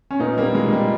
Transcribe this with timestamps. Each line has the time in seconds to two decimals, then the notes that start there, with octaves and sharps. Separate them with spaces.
0.11 C#4
0.19 A#2 B3 D#4
0.37 G3 A#3
0.44 A#2
0.55 G#3
0.67 A#2
0.72 G3